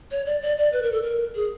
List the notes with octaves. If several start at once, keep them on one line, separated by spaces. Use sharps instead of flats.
C#5
D5
D5
D5
B4
A#4
A4
A#4
G#4